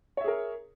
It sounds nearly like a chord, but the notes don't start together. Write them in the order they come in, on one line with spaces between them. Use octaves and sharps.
C#5 E5 G#4 A#4